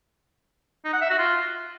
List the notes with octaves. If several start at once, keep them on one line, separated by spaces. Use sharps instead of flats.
D#4
F#5
E5
F#4
F4